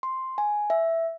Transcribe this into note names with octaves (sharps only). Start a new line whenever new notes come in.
C6
G#5
E5